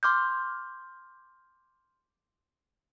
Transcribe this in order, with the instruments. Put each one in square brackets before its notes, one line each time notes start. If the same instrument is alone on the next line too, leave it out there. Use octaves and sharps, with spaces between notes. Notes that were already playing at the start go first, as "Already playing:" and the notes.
[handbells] C6 D6 F6 G6